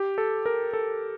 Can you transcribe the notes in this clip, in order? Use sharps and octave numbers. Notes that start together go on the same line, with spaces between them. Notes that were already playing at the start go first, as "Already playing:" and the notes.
Already playing: G4
A4
A#4
A4